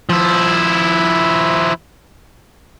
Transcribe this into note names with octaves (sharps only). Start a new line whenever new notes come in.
F3 E4